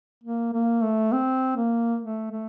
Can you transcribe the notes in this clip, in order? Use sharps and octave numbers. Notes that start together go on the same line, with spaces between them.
A#3
A#3
A3
C4
A#3
A3
A3